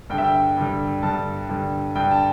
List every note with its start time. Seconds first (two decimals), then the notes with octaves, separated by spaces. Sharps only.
0.10 G2 D3 G3 G5
0.18 E5
0.24 G5
0.57 G2 D3 G3
1.03 G2 D3 G3 A5
1.49 G2 D3 G3
1.95 G2 D3 G3 G5
2.11 A5